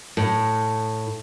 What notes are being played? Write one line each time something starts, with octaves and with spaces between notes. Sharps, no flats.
A2